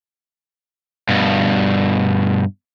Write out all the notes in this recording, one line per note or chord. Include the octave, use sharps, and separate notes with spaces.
G2 B2